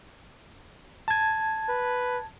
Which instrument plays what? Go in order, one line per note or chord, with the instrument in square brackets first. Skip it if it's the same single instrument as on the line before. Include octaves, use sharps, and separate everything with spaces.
[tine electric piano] A5 G#6
[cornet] B4